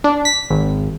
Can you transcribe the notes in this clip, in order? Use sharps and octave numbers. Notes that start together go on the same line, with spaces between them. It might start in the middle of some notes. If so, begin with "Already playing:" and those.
D4
B6
G#1